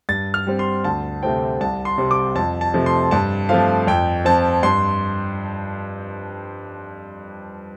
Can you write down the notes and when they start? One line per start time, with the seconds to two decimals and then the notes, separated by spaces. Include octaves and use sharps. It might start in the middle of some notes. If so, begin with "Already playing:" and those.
0.09 G2 A6
0.34 F6
0.47 G3 C4
0.59 C6
0.84 D2 A5
1.23 C3 A3 C4 G5
1.60 C2 A5
1.85 C6
1.98 C3 G3 C4
2.11 D6
2.35 F2 A5
2.61 A5
2.74 C3 F3 A3
2.86 C6
3.11 G2 A5
3.49 F3 A3 C4 F5
3.87 F2 G5
4.25 F3 C4 A5
4.63 G2 C6